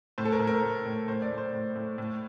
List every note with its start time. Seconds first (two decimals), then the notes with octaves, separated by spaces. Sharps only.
0.18 A2 C5
0.25 A4
0.32 A#4
0.39 A2
0.47 A#4
0.62 A2
0.85 A2
1.08 A2 C5
1.22 D5
1.31 A2
1.38 C5
1.53 A2
1.75 A2
1.98 A2